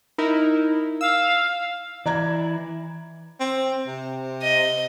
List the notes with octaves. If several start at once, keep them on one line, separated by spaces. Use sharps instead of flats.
D#4 E4 A#4
F5 E6
E3 E4 D5 A#5 G#6
C4
C3
D#5